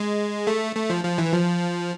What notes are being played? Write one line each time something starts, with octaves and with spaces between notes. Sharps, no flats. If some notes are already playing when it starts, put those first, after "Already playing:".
Already playing: G#3
A3
A3
F3
F3
E3
F3